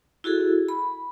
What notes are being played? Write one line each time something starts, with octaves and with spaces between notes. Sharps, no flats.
E4 F#4 G#4 A4
B5